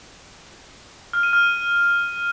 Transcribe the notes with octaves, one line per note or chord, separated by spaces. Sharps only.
F6
D#7
F6
D#7